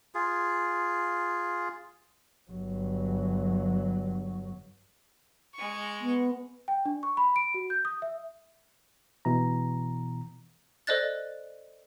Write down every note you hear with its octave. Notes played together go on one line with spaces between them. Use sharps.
F4 G#4
G1 F#3
G#3 C#6
B3
G5
D4
C#6
B5
D7
F#4
G6
D#6
E5
B2 E3 A#5
A4 C5 D5 D#5 F#6 A6